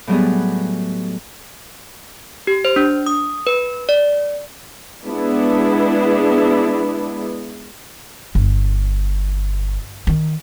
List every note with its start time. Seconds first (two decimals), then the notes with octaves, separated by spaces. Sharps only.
0.07 A2 F#3 G3 B3 G#4
2.47 G4
2.65 C5
2.76 D4
3.06 D#6
3.47 B4
3.89 D5
5.06 G#3 B3 D4 E4
8.35 G1
10.07 D#3